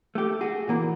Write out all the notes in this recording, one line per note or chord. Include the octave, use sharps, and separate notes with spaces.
A3 G4
F#4 G#4
A#2 E3 A#3